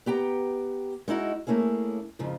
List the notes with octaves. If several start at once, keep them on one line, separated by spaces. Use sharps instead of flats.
B3 G4 G5 A#5
G#3 D#4 E4 F#4
A3 A#3 C#4 E4 G#4
F2 G#2 C#3 F3